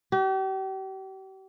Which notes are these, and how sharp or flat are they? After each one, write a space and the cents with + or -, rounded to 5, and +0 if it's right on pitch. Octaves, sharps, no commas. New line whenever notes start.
G4 -40